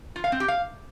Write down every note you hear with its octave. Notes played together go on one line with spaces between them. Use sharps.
F4
F5
C4
G4
F5